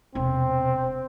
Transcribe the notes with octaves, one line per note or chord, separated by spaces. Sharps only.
E1 C3 C4